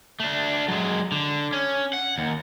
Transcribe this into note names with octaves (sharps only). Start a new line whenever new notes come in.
A3 D4
F#3 G#3
D3
C#4
F#5
D#2